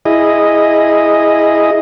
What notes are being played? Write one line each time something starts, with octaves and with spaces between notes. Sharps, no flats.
E4 G#4 D#5